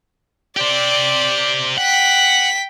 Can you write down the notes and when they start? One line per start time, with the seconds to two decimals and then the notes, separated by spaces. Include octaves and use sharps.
0.57 G4 C5 D5
1.78 F#5 G5 B6